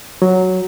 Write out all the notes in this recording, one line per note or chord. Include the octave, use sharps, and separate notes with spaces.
F#3